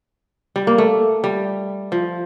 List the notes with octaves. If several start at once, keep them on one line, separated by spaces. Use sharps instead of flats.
G3
A#3
A3
G3
F3